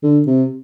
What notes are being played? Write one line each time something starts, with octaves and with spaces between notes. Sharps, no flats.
D3
C3